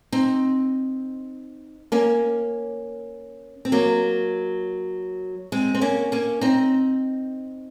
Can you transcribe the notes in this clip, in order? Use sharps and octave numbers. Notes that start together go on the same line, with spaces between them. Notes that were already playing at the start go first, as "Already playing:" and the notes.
C4 D#4
A#3 C#4
C4
F#3 A#3
G#3 C4
C4
A#3 C#4
A#3 C#4
C4 D#4